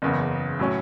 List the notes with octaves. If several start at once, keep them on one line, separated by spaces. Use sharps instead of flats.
F#1 E2 C#3
A2 F#3 C#4